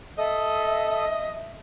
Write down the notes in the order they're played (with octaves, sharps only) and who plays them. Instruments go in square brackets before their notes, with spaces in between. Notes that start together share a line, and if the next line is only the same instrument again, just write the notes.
[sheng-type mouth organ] A4 [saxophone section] D#5 [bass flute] E5